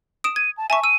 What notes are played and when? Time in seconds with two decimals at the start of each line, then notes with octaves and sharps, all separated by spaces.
0.24 D#6 D7 E7
0.36 G#6 D#7
0.57 A5
0.70 E5 G#5 A5 C#6
0.84 E6 D#7